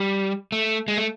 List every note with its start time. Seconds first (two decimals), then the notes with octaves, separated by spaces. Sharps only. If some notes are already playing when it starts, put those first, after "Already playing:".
Already playing: G3
0.52 A3
0.88 G#3
0.97 A3